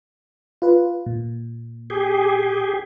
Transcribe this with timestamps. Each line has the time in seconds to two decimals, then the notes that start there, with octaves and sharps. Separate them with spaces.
0.62 F4 B4
1.06 A#2
1.90 G4 G#4